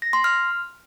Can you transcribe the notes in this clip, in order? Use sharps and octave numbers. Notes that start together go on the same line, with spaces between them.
A#6
C6
F6